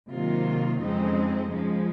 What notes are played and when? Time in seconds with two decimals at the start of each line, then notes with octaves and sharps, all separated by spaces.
0.10 C3 D#3 F#3 A#3 F4
0.81 F2 C#3 G#3 C4 D#4
1.51 C#3 F3 G#3